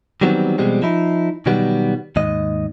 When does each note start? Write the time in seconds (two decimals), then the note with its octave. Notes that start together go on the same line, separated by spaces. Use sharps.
0.21 D#3 E3 F#3 G3 B3 C4
0.58 B2 E3 G3 G#3 C4
0.82 F3 D#4 E4
1.46 B2 D#3 F#3 G3 B3
2.16 D#2 G#2 D#5